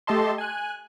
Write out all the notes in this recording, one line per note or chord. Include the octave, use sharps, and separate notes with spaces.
A3 G4 A4 D#5 A5 C6
G#5 F#6